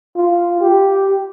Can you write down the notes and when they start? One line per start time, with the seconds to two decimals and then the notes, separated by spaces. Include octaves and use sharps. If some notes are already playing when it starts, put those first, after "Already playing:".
0.16 F4
0.61 G4